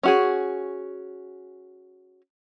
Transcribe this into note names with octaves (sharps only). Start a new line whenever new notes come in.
C#4 F#4 G#4